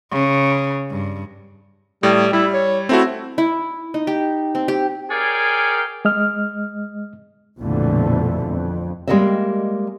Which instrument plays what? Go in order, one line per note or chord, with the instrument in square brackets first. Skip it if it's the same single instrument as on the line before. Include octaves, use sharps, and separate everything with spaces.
[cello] C#3
G2
[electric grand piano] A2 [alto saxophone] G3
[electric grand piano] G3 [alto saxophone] E4
[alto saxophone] C#5
[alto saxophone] A3 [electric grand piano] C4 E4 F#4
[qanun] E4
D#4
G4
C4
G4
[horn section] G#4 A#4 C#5 D5 F5 G5
[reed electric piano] G#3 D#5 F6
[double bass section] A#1 F2 B2 D3 E3 A3
F2
[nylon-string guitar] G3 G#3 A#3 A4 D#5 E5